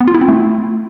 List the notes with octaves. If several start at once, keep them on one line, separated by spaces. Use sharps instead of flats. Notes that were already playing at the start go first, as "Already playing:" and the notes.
B3
F4
E4
C4
A3